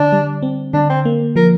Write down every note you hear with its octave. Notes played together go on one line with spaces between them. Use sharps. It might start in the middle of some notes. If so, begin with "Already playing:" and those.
Already playing: D3 D4
G3
C4
D3 D4
C4
A#3
F3 A#4